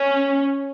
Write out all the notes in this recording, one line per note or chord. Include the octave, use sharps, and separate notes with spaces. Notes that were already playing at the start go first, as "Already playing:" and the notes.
Already playing: C#4